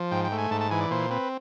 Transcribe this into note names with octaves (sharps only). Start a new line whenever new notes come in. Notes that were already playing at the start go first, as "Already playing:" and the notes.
Already playing: F3
G#2 G5
G5
A3
G#5
G#2 A5
A5
E3 G#5
D5
A#2 C5
C4 B4